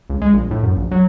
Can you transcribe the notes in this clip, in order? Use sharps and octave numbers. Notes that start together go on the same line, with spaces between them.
C#2
G#3
A#1
A2
F#2
A#1
F#3